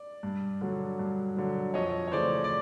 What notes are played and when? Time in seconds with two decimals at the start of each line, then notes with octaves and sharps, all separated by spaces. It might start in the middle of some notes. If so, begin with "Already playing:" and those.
Already playing: D5
0.23 G2
0.61 D3 F#3
0.99 G2
1.37 D3 F#3
1.74 F2 C#5 D#5
2.08 C#5
2.12 C#3 E3 A3 C5 D5
2.44 D5